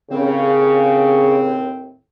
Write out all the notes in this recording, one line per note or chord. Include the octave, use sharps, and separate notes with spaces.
D#2 A2 C#3 C4